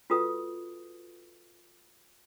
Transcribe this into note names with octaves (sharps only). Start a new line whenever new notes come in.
F4 F#4 A4 B4 D#6